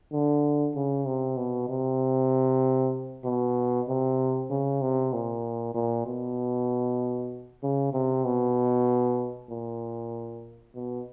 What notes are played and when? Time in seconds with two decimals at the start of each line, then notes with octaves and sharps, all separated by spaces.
0.12 D3
0.75 C#3
1.06 C3
1.37 B2
1.69 C3
3.25 B2
3.88 C3
4.50 C#3
4.82 C3
5.13 A#2
5.75 A#2
6.06 B2
7.63 C#3
7.93 C3
8.25 B2
9.50 A#2
10.75 B2